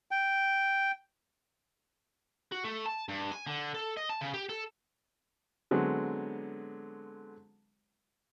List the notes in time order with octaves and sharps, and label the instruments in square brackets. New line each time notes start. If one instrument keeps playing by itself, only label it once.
[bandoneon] G5
[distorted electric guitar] F#4
A3
A5
G2
G#5
D3
A4
D#5
A5
C#3
G4
A4
[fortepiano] D3 F#3 G#3 B3 C4